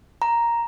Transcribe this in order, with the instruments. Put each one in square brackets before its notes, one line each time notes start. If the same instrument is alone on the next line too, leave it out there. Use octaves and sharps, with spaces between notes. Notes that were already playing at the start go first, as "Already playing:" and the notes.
[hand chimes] A#5